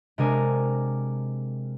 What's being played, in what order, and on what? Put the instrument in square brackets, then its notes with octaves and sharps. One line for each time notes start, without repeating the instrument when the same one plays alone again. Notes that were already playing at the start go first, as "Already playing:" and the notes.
[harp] C3 G#3 D4 A#4 G#5